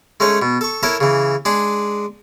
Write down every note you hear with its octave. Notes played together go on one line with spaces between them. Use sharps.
G#3 A3 C#4 D#4 C#5
B2
A4 C#6
E4 A4 A#4 C#5 E5
C#3 E3
G#3 D4 G#4